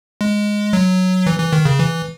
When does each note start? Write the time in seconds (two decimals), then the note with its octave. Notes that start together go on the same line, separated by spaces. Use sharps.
0.21 G#3
0.73 F#3
1.26 E3
1.39 E3
1.53 D#3
1.65 C#3
1.79 E3